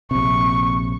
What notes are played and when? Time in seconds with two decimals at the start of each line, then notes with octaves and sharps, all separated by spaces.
0.11 A#1 C3 C#6